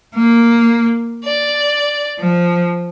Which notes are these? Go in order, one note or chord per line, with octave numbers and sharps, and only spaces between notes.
A#3
D5
F3